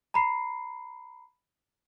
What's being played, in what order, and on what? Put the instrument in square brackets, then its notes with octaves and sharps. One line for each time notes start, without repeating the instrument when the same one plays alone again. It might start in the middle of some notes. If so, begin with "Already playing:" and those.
[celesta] A#5 B5 C7